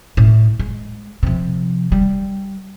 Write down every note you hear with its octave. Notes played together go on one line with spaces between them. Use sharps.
A2 C#4
G#3
C3 F3
G3